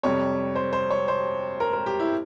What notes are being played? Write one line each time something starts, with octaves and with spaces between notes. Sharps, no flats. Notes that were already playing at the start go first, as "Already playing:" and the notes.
F2 C3 G3 C#5
C5
C5
C#5
C5
A#4
A#4
G4
E4